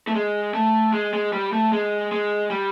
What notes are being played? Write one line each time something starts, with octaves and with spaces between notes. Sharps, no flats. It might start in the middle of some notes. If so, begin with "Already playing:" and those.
A3
G#3
A3
G#3
G#3
G3
A3
G#3
G#3
G3